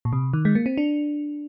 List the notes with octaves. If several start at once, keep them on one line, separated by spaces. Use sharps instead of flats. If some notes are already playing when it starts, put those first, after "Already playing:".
A#2
C3
D#3
G#3
A#3
C4
D4